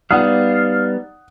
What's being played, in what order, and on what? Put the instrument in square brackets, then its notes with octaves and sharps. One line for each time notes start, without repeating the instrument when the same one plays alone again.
[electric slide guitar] G3 B3 [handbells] D#4 D5 [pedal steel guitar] F5 [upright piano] F#5 D#6